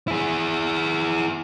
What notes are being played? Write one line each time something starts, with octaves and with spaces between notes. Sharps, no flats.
E4 G#4